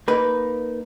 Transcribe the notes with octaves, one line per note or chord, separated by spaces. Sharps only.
A#3 D#4 B4